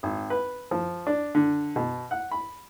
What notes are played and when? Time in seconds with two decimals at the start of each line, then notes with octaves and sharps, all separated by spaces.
0.03 G#1
0.30 B4
0.71 F3
1.07 D4
1.35 D3
1.76 B2
2.11 F#5
2.31 B5